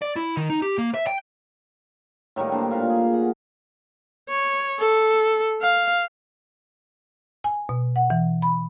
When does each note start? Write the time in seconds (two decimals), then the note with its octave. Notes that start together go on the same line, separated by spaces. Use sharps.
0.02 D5
0.16 E4
0.37 D#3
0.50 D#4
0.62 G4
0.78 A#3
0.94 E5
1.07 G5
2.36 A2 D#3 G3 A#3
2.52 D4 C5
2.70 A#2 F5 C#6
2.90 G#4
3.14 F#5
4.29 C#5
4.80 A4
5.62 F5
7.44 G#5
7.69 B2
7.96 F#5
8.10 E3
8.42 B5